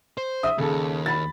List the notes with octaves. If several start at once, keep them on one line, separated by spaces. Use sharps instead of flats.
C5
E5 D#6
D#2 C#3 A4
B5 A6